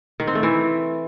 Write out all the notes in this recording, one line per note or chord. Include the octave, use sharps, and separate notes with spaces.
D#3
C4
A3
E3